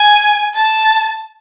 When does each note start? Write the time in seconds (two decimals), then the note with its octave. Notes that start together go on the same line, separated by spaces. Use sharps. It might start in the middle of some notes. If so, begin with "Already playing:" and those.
Already playing: G#5
0.55 A5